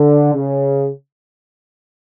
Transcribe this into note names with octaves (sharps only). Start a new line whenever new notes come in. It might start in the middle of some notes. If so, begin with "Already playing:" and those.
Already playing: D3
C#3